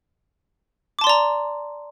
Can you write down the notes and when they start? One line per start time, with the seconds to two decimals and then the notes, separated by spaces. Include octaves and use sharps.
0.99 D6
1.01 A5
1.04 C6
1.07 D5
1.09 A#5